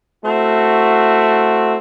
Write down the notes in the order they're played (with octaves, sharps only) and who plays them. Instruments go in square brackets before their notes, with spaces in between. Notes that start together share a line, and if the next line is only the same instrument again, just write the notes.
[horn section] A3 C4 E4 F#4